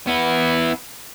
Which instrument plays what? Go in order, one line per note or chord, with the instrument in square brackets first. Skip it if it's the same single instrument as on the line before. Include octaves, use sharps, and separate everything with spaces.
[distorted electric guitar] B3 E4